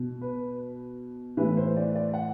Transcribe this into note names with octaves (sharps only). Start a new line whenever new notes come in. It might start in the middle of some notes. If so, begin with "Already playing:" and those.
Already playing: B2
B4
A2 E3 B4
C5
D5
D5
F#5